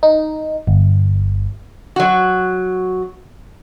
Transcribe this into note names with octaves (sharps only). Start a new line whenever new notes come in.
D#4
G1
F#3 F#4